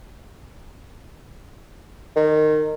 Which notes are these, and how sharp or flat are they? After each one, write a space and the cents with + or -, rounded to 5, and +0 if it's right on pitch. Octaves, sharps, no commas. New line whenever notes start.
D#3 -20